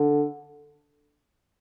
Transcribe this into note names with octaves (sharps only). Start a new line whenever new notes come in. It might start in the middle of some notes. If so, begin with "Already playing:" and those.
Already playing: D3